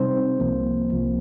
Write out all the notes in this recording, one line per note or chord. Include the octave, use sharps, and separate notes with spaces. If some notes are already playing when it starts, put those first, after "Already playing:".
Already playing: C3 G3 C4 D#4 C5
C2 C3 F3 A#3
C2 C3 F3 A#3